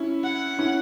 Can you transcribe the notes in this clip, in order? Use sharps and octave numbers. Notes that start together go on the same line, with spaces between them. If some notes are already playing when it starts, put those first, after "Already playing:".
Already playing: C#4 E4
F#5
C#4 E4